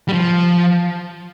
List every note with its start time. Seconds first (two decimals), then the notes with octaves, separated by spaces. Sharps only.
0.08 G3
0.13 F3